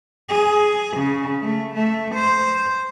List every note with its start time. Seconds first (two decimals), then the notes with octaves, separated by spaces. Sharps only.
0.29 G#4
0.97 C#3
1.42 A3
1.74 A3
2.15 C5